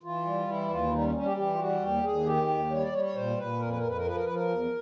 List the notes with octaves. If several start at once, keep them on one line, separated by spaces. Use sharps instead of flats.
E3 F4
G3
E3 E4
D#2 F4
E4
G3 D#4
C#4
G3 C#4
G4
E3 G4
F4
G3 F#4
D#2 G4
D#2 G#4
D#3 G4
D#2
G3 C#5
D5
G3 C#5
C#5
A#2 C5
A#2 B4
F2 A#4
B4
F2 A#4
B4
A#4
F3 B4
A#4
F3 B4
A#4
E2